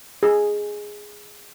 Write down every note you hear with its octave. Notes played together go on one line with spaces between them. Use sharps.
G#4